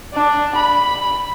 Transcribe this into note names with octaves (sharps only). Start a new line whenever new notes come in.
D4
B5